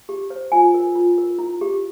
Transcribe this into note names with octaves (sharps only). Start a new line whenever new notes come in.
G4
C5
F4 G#5
A#4
F4
A#4
E4
G4